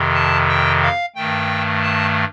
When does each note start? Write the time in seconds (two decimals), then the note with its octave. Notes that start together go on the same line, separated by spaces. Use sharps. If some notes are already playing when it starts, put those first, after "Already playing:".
Already playing: F2 C3 D#3
0.14 A5
0.48 G5
0.82 F5
1.15 G2 D#3 A3 G5
1.83 A5